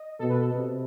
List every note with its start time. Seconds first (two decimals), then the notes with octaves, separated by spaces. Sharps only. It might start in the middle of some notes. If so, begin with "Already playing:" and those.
Already playing: D#5
0.19 B2 A4
0.30 B4
0.40 A4
0.54 C3